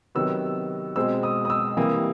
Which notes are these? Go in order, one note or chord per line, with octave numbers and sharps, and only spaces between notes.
C3 D#3 F#3 B3 E6
B2 G#3 C4 E6
D#6
D#6
E6
C3 E3 G3 A#3 D#6